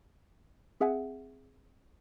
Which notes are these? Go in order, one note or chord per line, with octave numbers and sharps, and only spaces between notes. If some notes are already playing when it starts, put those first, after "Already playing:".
C4 G#4 E5 F#5 G#5